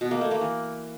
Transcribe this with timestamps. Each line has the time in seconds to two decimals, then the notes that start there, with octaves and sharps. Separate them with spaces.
0.01 B2
0.11 A#3
0.21 A3
0.31 A#3
0.41 E3